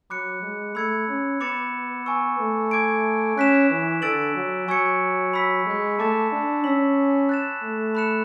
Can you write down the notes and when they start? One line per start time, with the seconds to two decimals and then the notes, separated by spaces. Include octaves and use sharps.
0.10 F#3 B5 D6 F#6 C#7
0.42 G#3
0.75 A3 B5 E6 G#6 C#7
1.08 C#4
1.40 B3 B5 D6 A6 C#7 E7
2.06 G#5 C#6 E6
2.39 A3
2.71 G#5 D6 G#6 D7
3.37 C#4 F#6 B6 E7
3.70 E3
4.02 D3 E6 A6 D7 F#7
4.35 F#3
4.68 F#3 G#5 C#6 E6 G#6 C#7
5.33 B5 E6 B6
5.66 G#3
5.99 A3 A5 D6 A6 E7
6.32 D4
6.64 C#4 E6 B6 F#7
7.29 F#6 A6 E7
7.63 A3
7.95 B5 F#6 C#7 E7